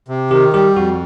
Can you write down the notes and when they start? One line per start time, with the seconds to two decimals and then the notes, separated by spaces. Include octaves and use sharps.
0.08 C3
0.31 D#3 G4
0.53 G3 G4
0.76 F2 F#4